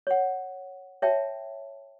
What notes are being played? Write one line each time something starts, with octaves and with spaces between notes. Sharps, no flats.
C#5 F#5
C#5 E5 G5 A5